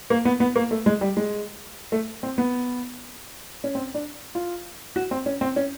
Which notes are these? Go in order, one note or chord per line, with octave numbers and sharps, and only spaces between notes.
A#3
B3
B3
A#3
A3
G#3
G3
G#3
A3
C4
B3
C#4
C4
D4
F4
F#4
C4
C#4
C4
C#4